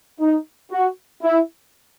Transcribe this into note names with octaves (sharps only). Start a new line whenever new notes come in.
D#4
F#4
E4